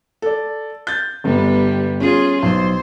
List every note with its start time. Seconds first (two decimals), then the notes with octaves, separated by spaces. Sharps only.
0.22 A4 D5
0.87 G6 A6
1.24 G1 G3 B3
2.00 C#4 F4 G#4
2.42 B1 C5